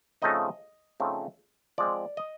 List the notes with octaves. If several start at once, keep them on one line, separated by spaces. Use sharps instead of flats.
C#3 F3 A3 C4 D#4 D#5
C#3 F3 A3 C4 D#4
F3 G#3 C4 D5
D#5